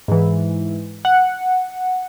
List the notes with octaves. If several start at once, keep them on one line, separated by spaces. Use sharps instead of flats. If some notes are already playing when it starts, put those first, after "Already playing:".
G#2 E3
F#5